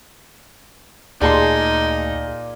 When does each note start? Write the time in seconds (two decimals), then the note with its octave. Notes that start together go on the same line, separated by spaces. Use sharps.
1.21 D2 A#2 D#4 G#4 D5 A5 C6